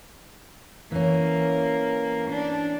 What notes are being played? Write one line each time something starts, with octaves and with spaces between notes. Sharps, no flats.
E3 A#3 C#4
D4